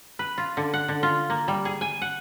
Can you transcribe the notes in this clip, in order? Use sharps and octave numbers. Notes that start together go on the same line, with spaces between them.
B4
F4
D3
F#5
D3
F4
A#3
G3
G#4
G#5
F#5